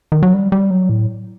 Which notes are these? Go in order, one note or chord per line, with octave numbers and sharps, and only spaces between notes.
D#3
F#3
G3
G3
F#3
A2